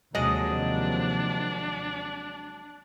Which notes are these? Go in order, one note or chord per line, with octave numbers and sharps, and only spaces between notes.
D#2 C3 F3 F#3 G#3 D4 D#5